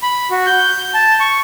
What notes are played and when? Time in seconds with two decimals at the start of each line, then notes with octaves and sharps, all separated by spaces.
0.03 B5
0.31 F#4
0.46 G6
0.94 A5
1.20 C#6